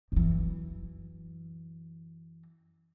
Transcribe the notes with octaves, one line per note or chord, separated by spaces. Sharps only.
F#2 E3